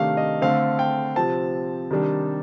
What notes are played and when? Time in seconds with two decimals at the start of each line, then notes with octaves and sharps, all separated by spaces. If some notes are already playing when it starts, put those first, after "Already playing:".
Already playing: C3 D#3 A3 D4 F5
0.17 D#5
0.42 D3 A3 C4 F5
0.79 G5
1.16 C3 F3 C4 A5
1.90 C3 D#3 G3 D4